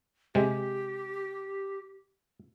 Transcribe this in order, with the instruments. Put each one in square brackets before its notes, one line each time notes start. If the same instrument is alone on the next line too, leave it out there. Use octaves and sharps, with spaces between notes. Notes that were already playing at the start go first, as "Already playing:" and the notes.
[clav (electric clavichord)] C3 G#3 [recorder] G4